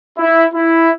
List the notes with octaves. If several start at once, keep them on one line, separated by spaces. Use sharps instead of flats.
E4
E4